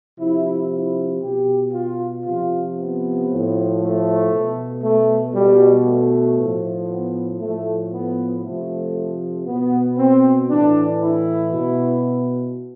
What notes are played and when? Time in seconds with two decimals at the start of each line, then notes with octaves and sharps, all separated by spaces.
0.19 C3 F3 E4
0.70 E4
1.21 B2 G4
1.72 F4
2.24 C3 F3 F4
2.75 B3
3.28 A2 F3
3.79 A3
4.31 B2
4.83 A3
5.33 B2 G3
5.85 A3
6.37 A2 F3
6.88 B3
7.40 A2 F3 A3
7.92 B3
8.43 C3 F3 A3
9.46 B2 B3
9.98 C4
10.49 A2 E3 D4
11.00 E4
11.52 B2